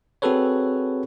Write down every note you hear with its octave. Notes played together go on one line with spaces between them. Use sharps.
C4 F#4 G#4 A4 B4 C#5